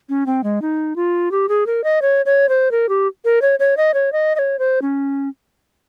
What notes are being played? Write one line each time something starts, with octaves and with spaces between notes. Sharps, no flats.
C#4
C4
G#3
D#4
F4
G4
G#4
A#4
D#5
C#5
C#5
C5
A#4
G4
A#4
C#5
C#5
D#5
C#5
D#5
D#5
C#5
C5
C#4